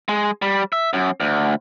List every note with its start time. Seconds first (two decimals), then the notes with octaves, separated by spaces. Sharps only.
0.09 G#3
0.42 G3
0.73 E5
0.93 F#2
1.20 D2